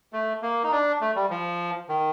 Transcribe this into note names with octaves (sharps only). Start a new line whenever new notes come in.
A3
A#3
D#4
D4
A3
G3
F3
D#3